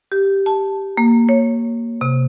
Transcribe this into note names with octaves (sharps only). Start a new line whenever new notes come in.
G4
A5
A#3
C#5
C3